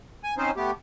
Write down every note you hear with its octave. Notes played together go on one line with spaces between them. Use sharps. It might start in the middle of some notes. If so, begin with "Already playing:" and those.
G#5
C4 C#4 D#4 C5
A3 B3 G4